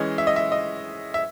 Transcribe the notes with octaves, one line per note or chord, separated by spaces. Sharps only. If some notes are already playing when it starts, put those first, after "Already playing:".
Already playing: E3 G#3 C#4 D#5
E5
D#5
E5
D#5
E5